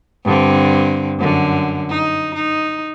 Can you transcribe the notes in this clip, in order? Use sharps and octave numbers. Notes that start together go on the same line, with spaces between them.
G2 D3 C4
F#2 D3
D#4
D#4